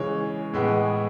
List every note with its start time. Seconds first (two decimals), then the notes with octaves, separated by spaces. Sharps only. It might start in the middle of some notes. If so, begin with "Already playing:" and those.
Already playing: C#3 E3 G#3 C#5
0.53 A2 E3 G#3 B3